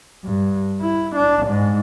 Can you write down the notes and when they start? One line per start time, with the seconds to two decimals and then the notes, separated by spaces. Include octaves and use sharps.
0.25 G2
0.82 E4
1.16 D4
1.47 G#2